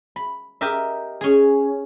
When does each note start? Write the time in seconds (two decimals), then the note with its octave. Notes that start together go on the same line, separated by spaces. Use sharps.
0.16 B5
0.61 G4 A#4 D#5 E5
1.21 C#4 G#4